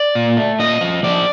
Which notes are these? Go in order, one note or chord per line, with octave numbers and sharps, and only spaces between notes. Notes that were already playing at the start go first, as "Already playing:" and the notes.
Already playing: D5
A#2
A3
A#2 D#5
F3
F3 D5